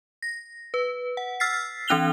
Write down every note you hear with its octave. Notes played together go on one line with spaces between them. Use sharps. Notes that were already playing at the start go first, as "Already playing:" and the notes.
A#6
B4
F#5
E6 F6 A6 B6 C7
E3 C4 D4 F#6 F7 G7